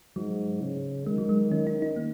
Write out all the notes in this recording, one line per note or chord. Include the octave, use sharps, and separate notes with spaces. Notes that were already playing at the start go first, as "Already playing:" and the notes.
G#2 F#3
C#3
D#3 G#3
F#3
G#3
D#3 C#4
D#4
D#4
A#3